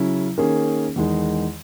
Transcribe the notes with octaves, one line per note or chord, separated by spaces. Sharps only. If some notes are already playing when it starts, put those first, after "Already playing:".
Already playing: C#3 F#3 C#4 E4
D#3 A#3 C#4 G#4
E2 D#3 G#3 D#4